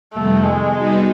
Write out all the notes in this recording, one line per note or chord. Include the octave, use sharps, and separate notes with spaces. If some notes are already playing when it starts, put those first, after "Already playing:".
F2 C3 D#3 G3 A3 B3
G#3
G3 B3 D#4 F#4 B4